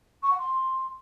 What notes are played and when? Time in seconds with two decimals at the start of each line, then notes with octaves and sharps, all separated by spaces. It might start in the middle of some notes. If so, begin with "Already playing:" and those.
0.22 C#6
0.30 F#5
0.38 C6